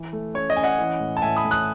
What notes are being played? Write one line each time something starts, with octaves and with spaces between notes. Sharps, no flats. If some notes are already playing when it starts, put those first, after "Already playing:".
Already playing: E3
A3
C#4 C#5
D#5
C#4 G#5
D#5 F#5
E3
A2
A5
A2 E5 G#5
B5 D#6
A2
D#6 F#6